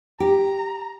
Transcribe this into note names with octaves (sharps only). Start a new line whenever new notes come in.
G4 A#5